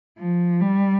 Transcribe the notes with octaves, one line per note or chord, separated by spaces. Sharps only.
F3
G3